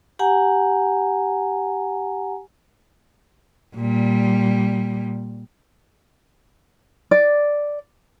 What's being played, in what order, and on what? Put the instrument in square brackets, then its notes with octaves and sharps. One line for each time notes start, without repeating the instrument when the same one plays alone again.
[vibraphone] G4 F#5 G#5 A#5
[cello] A#2 G3
[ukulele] D5